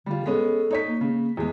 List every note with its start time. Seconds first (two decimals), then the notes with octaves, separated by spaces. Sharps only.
0.06 D3 G3 F4
0.26 G#3 B3 C#4 A4
0.71 D#4 C#5 B6
0.87 A#3
1.01 C#3
1.37 E2 G#3 G#4